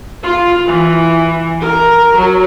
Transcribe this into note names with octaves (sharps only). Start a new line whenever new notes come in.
F4
E3
A#4
F#3